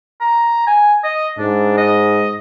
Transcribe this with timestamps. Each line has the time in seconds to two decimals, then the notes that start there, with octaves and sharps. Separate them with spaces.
0.21 A#5
0.67 G#5
1.04 D#5
1.39 G#2 D4
1.78 D#5